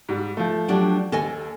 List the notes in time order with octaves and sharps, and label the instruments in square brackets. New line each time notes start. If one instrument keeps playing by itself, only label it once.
[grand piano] G#2 G3
F3 A3
[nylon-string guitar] F#3 D4 G4
[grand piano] D#2 [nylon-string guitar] A4 D#5 G#5